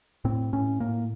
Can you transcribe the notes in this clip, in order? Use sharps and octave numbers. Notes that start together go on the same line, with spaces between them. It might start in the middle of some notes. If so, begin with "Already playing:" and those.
A2 C4
A2 C#4
A2 A#3